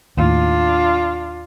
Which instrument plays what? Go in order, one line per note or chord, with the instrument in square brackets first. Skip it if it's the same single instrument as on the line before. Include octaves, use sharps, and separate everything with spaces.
[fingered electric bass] D#2 A2 [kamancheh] D4 F4